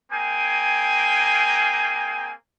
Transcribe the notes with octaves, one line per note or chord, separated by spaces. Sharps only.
A#3 C4 G#4 G5 G#5